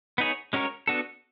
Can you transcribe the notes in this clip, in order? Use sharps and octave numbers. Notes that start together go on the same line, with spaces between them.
B3 D#4 G#4 C#5
G#3 C#4 F#4 A#4 C#5
B3 D4 F#4 A4